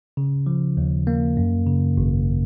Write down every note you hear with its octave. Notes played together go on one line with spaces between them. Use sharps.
C#3
F3
D#2
A#3
F#2
C#3
G#1